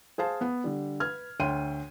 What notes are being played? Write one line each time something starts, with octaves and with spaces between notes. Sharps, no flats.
G#4 C5 F5 A5
B3
D3 G3
B4 F6 G#6
D2 C#5 G5 C6 D#7